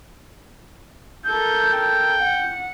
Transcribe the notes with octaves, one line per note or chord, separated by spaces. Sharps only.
A4 A#4 G6
G5
F#5